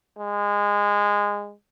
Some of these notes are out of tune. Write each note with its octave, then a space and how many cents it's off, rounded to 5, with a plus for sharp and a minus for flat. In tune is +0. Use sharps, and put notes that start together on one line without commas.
G#3 -20